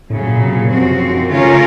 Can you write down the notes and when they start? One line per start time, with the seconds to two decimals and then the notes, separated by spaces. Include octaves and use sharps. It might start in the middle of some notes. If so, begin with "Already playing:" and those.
0.10 F#2 A2 C#3 F#3
0.25 A#2
0.40 C3
0.55 A#2
0.70 F#2 C3 F3 C4 F#4
0.91 C#3
1.10 D#3
1.30 C#3 A3 C#4 F4 A#4 C#5
1.45 C#3